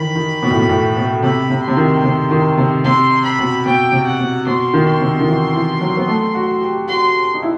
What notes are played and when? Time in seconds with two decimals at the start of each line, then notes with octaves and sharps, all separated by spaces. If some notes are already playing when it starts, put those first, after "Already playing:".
Already playing: D#3 E3 B5
0.15 D#3
0.43 B2
0.50 A2
0.59 B2
0.69 A2
0.97 B2
1.23 C3 B5
1.50 C3
1.63 C3 C6
1.77 D#3
2.04 C3
2.31 D#3
2.58 C3
2.84 C3 C6
3.25 B5
3.39 B2
3.66 B2 G5
3.92 C3
4.06 F#5
4.19 B2
4.46 B2 C6
4.74 D#3
4.87 C6
5.01 C3
5.20 D#3
5.27 E3
5.54 E3
5.81 F#3
5.97 B3
6.08 A3
6.35 F#4
6.61 G4
6.88 F#4 C6
7.34 D#4
7.42 E4